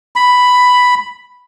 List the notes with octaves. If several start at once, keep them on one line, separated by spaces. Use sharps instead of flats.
B5